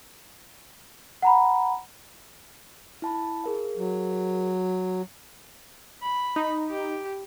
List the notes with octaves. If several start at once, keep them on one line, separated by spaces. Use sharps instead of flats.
F#5 A#5 B5
E4 A5 B5
G#4 A#4 F5
F#3
B5
D#4
G4